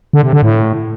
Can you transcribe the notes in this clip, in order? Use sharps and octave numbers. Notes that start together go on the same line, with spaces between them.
D3
C3
D3
A2